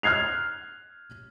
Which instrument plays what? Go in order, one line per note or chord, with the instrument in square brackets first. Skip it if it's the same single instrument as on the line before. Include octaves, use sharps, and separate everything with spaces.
[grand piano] F6 F#6 G#6 C7 F7